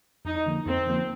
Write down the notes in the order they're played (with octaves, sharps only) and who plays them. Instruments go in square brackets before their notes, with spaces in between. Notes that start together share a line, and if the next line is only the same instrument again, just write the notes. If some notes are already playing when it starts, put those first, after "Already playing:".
[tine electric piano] F2 [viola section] D#4
[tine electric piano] D3 F3 A#3
[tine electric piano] F2 [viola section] C4
[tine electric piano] D3 F3 A#3